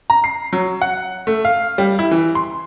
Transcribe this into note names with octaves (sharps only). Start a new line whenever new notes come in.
A#5
C7
F#3
F#5
A3
F5
G3
E4
E3
C6